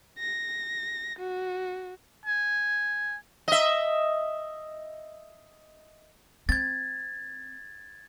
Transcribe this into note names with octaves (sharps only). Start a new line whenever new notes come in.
A#6
F#4
G#5
D#5 E5
C4 G#6 A6